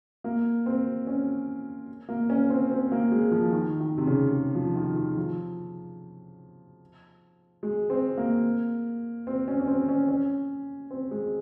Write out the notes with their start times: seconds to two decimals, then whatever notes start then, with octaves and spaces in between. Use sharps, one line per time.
0.24 A#3
0.66 C4
1.07 C#4
2.09 A#3
2.30 C#4
2.50 C4
2.71 C4
2.92 A#3
3.12 G#3
3.31 F3
3.52 D#3
3.80 D#3
3.98 C3
4.07 C#3
4.55 F3
4.75 D#3
4.96 D#3
5.17 F3
7.63 G#3
7.90 C4
8.17 A#3
9.27 C4
9.48 C#4
9.60 C#4
9.68 C4
9.89 C#4
10.08 C#4
10.91 C4
11.11 G#3